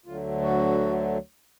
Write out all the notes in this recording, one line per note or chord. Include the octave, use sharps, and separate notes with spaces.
D2 D3 F#3 A3 F4
F#4